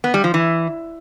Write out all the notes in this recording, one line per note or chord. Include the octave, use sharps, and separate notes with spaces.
B3
G3
F3
E3